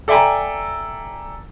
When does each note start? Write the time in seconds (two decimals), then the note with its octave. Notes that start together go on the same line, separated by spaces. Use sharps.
0.08 A4 D5 E5 G5 G#5 A#5